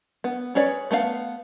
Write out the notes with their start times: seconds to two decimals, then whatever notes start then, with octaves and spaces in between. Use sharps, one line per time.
0.24 B3
0.55 C#4 G#4 B4 C#5 D5
0.91 A3 B3 C5 F5